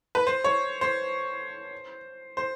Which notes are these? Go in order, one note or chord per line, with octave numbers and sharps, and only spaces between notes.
B4
C5
C#5
C5
C5